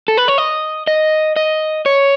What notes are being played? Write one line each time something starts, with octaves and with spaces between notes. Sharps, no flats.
A4
B4
C#5
D#5
D#5
D#5
C#5